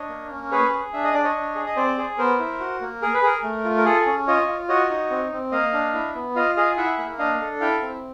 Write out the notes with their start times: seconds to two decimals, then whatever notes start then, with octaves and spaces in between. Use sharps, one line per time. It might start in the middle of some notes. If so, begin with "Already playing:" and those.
Already playing: D4 C#5 D#5
0.09 A#3
0.31 C#4
0.51 G#4 B4 C#5
0.72 G#4
0.93 D4 E5
1.04 D#5
1.14 D4 D5
1.24 C#5 D#5
1.35 D4
1.55 G#4
1.67 D#5
1.77 C4 C5 D5
1.98 G#4
2.18 B3 A#4 C5
2.40 E4
2.60 F#4
2.81 A#3
3.02 G#4 A#4
3.14 B4
3.23 G#4 A#4
3.43 A3
3.65 F4
3.77 A#4
3.85 G#4 A4
4.06 C#4
4.27 F4 C#5 D#5
4.48 F4
4.69 F#4 C#5 D#5
4.90 D#4
5.11 C4
5.32 C4
5.52 A#3 D#5 F5
5.73 D4
5.94 E4
6.15 B3
6.36 F4 D#5 F5
6.56 G#4 D#5 F5
6.77 E4 E5 F#5
6.98 A#3
7.19 D4 D#5 F5
7.40 A4
7.60 E4 F5 G5
7.82 C4